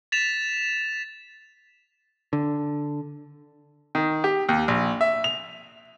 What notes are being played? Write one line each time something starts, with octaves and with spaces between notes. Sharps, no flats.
A6 B6 E7 F7
D3
D#3
G4
D#2
A#1
E5
F7